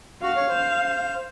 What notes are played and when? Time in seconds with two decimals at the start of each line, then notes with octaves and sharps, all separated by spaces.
0.23 F#4 F5
0.36 C#5
0.49 C5